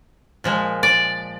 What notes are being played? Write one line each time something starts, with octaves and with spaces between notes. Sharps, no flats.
A#2 F3 G#3
D5